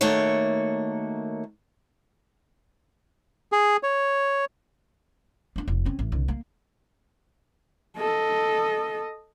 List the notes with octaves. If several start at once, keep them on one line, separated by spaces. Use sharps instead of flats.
D#3 A3 A#3 F#4 C#5
G#4
C#5
B3 D4
F1
C4 C#4
A1
C2 D3
A#3
A4 D#5